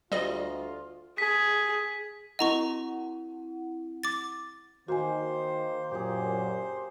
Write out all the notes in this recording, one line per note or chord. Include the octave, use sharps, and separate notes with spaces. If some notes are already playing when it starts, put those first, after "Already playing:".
D2 G3 F4 D#5
G#4 B6
C4 E4 D#5 F#5 A#5 C#6
D6 A6
D#3 A#3 F#4 C5 G#5
F#2 A#2 G4 G#4 C5